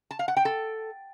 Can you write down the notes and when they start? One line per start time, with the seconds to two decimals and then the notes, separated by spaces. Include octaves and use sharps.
0.11 A5
0.19 F5
0.28 F#5
0.37 G5
0.45 A4